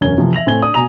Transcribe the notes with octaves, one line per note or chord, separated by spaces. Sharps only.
E1 F#2 C#4 G#6 G7
C3 E3 F3
E5 A#6 F7 F#7
A2 C4 G#5 G#6 G7
D4 D#6
B2 G#5 A#5 D#6 F7